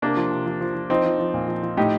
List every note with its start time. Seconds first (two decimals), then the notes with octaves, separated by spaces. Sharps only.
0.02 C3 A#3 D4
0.17 F3
0.31 C3
0.46 F3
0.61 F3
0.75 F3
0.90 F3 C4 D#4
1.05 F3
1.19 F3
1.34 A#2
1.48 F3
1.63 F3
1.77 A2 D#4 G4